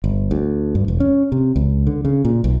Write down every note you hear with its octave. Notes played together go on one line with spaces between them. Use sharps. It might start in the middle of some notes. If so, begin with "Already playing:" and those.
G1
D2
G2
E1
C#4
C3
C#2
D3
C#3
A#2
B1